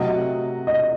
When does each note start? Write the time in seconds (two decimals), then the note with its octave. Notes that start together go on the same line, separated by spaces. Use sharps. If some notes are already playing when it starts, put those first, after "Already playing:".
Already playing: C3 F#3 A3 D#5 F#5
0.67 D#5